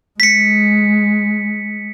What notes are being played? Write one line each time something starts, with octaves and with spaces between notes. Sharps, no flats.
G#3 B6 C#7